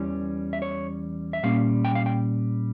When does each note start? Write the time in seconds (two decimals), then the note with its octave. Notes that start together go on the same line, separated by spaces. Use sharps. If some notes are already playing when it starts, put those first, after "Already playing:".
Already playing: E2 E3 G3 C#4
0.53 E5
0.62 C#5
1.33 E5
1.43 A#2 G3 A#3 C#4 F5
1.85 G5
1.95 F5
2.06 G5